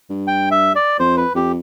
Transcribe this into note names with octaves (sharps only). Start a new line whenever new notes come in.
G2
G5
E5
D5
F2 C5
B4
F2 G4